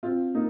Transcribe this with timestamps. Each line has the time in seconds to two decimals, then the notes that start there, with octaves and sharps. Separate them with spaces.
0.03 C4 F4
0.34 A#3 D#4